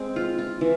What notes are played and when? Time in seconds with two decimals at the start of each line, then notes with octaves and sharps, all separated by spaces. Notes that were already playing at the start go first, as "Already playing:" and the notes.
Already playing: G#3 C4
0.16 F4
0.39 F4
0.61 E3